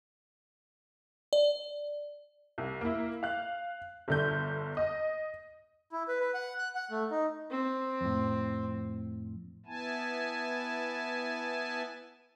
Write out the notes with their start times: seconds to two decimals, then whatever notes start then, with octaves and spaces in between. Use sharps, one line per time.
1.33 D5
2.58 C2
2.81 A#3 E4
3.23 F5 F#6
4.08 G1 D3 G6
4.77 D#5
5.92 E4
6.08 B4
6.20 B4
6.34 F#5
6.58 F#6
6.75 F#5
6.91 A3
7.11 D#4
7.51 C4
8.01 F2 A2
9.66 B3 E4 G#5 A5